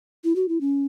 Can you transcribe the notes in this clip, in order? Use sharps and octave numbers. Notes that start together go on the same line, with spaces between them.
E4
F#4
E4
C#4